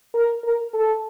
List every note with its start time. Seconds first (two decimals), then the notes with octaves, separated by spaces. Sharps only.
0.14 A#4
0.44 A#4
0.74 A4